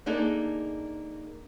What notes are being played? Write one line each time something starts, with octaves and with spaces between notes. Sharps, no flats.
A#3 D4 D#4 G#4 A4